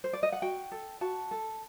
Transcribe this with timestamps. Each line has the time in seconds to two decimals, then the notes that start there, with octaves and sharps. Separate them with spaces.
0.04 C5
0.13 D5
0.23 D#5
0.32 F#5
0.42 F#4 G5
0.72 A4
1.01 F#4 A5
1.31 A4